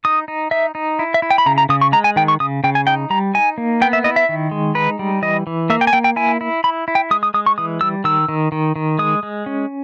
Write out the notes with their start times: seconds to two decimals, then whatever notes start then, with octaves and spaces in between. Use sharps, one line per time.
0.05 D#4 D#6
0.28 D#4
0.51 D#4 E5
0.75 D#4
0.99 E4
1.14 E5
1.22 E4
1.31 G5
1.38 B5
1.46 C#3 A#5
1.58 A#5
1.69 C#3 D#6
1.81 C#6
1.92 G#3 A#5
2.04 G#5
2.16 D#3 G5
2.28 C#6
2.40 C#3 D#6
2.64 C#3 G5
2.75 G#5
2.87 D#4 G5
3.10 G3 A#5
3.34 D#4 G#5
3.58 A#3
3.81 B3 G5
3.93 E5
4.04 E4 D#5
4.16 E5
4.29 D#3
4.51 G#3
4.75 D#4 B4
4.99 G3
5.22 E3 D#5
5.47 E3
5.70 A#3 E5
5.81 G5
5.87 G#5
5.93 A#3 G5
6.04 G5
6.16 E4 G#5
6.41 E4
6.64 E4 B5
6.88 E4
6.95 G5
7.11 G#3 D#6
7.23 D#6
7.34 G#3 D#6
7.46 C#6
7.58 E3 D#6
7.81 G3 E6
8.04 D#3 E6
8.28 D#3
8.52 D#3
8.76 D#3
8.99 G#3 D#6
9.23 G#3
9.46 C#4